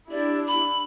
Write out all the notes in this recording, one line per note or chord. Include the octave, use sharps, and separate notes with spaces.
D4 E4 G4 D5
B5